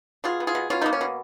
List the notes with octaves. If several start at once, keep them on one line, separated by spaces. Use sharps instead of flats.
B2 F4 G#4
B3
F4 G#4
B2
B2 C#4 F4
A#3 B3 D#4
C#4
B2